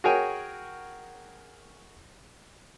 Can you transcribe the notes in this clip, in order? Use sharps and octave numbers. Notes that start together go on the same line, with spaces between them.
F#4 G#4 A#4 C#5 G5 G#5